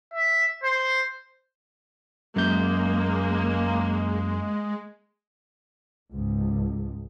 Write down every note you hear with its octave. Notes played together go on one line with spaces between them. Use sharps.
E5
C5
F#2 G#3 A#3 G6
C#2 G#2